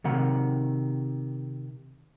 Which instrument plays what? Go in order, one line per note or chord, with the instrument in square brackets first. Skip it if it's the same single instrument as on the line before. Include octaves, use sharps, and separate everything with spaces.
[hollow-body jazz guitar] C3 D#3 F#5